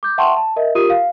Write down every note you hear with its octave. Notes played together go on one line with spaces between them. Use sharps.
D6 G6
E5 F#5 G5 A5 C6 C#6
A5
A#4 D#5 E5
F4 G4 A#4 D#6 D#7
F5